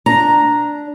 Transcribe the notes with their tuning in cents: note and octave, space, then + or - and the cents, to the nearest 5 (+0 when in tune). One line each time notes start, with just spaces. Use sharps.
D4 +0 A#5 +0